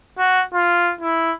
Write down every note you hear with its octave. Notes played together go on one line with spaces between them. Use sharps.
F#4
F4
E4